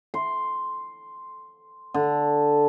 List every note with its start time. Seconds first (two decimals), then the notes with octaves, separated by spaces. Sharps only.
0.14 C6
1.94 D3